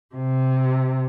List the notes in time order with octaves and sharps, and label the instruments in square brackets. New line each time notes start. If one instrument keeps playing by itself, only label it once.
[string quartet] C3